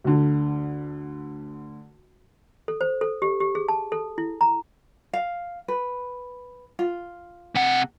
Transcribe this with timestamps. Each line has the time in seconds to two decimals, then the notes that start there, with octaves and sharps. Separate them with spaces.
0.04 D2 D3
2.68 A4
2.81 C5
3.01 A4
3.22 G4
3.40 G4
3.55 G#4
3.68 A5
3.92 A4
4.18 E4
4.41 A#5
5.13 F5
5.68 B4
6.79 F4
7.55 C3 F#5